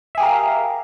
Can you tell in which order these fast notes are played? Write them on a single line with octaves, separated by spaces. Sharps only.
E5 G#4 G4 A#4 F5